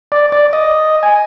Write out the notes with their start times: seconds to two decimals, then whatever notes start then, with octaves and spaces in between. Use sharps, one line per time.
0.12 D5
0.32 D5
0.53 D#5
1.03 G#5